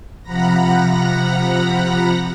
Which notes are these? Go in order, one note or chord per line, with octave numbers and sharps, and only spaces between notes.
C3 F3 F#5 A#5 B5 A#6